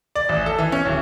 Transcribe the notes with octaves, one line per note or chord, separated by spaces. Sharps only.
D5
A1
A4
E3
C#4
D1